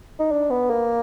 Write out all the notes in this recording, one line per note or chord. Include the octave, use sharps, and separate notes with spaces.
D#4
D4
B3
A#3